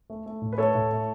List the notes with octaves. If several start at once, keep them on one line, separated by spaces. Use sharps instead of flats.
A3
A3
A2
B4
A3 A4 C#5
A2
A3